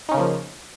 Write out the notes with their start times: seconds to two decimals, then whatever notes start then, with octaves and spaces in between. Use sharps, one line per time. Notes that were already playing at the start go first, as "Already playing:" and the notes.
0.09 D#4
0.12 C#4
0.14 C#3
0.17 A#3
0.20 F3